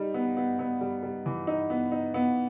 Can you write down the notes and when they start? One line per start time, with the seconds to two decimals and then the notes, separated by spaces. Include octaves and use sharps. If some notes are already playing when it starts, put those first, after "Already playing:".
Already playing: G3 D#4
0.14 B3
0.37 B3
0.59 B3
0.81 G3
1.03 G3
1.26 E3
1.47 D#4
1.70 B3
1.92 D#4
2.14 B3